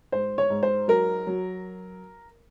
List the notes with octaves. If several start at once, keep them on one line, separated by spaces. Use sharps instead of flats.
G#2 C5
C#5
G#2
C5
F#3 A#4
F#3